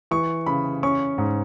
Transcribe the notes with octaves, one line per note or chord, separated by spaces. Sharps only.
E3 C#6
C#3 B5
C#4 C#6
G#2